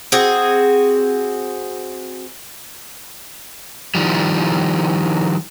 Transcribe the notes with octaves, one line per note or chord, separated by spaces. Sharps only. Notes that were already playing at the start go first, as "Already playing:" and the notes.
C4 F#4 G#4
D#3 F3 G3